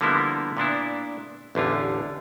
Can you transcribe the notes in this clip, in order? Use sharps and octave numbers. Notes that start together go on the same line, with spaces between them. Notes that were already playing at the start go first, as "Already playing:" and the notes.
D3 F3 G3 A#3 B3 E4
A#2 B3 D4 E4
A1 E2 D3 F4